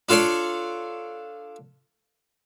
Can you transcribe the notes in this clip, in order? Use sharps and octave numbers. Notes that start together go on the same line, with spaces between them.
D4 F4 A4 C#5 D5